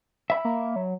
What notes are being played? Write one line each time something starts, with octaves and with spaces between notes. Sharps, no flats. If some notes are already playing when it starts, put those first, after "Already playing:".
E5 B5
A#3
F#3